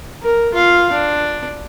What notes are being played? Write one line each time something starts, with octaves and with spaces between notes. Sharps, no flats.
A#4
F4 F5
D4